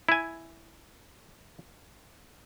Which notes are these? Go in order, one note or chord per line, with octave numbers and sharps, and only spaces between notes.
E4 G#5